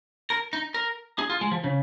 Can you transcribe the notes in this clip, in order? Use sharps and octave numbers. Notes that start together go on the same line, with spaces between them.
A#4
D#4
A#4
G#4
F4
G#3
F3
C#3